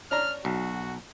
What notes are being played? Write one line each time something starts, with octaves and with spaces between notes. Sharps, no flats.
C#4 D4 A#5 F6
B1 F#4